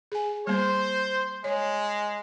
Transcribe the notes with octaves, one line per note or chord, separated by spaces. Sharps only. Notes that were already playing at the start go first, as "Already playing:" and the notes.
G#4 G#5
G3 A#3 C5
G#3 C#5